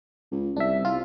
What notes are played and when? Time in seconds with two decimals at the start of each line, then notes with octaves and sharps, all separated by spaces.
0.32 C#2
0.56 C2 D4 E5
0.85 C2 F4